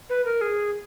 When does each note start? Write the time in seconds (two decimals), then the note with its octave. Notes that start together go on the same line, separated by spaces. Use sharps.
0.10 B4
0.25 A#4
0.41 G#4